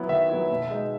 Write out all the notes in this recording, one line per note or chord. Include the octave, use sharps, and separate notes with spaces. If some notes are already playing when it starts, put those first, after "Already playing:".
Already playing: F#3 B3 E4
D#3 E5
F#3 B3 E4
B2
G#3 D#4